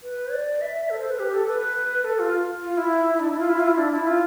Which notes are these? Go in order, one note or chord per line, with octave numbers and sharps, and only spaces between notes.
B4
D5
E5
A4
C5
B4
G4
A4
B4
A4
F4
F4
E4
E4
D4
E4
F4
E4
F4
E4
D4
E4
F4